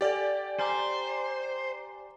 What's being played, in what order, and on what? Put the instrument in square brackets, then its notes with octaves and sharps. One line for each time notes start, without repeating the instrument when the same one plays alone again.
[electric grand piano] G4 D5 [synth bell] A4 G#5 A6
[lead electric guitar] C5 [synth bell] G#5 A#5 D6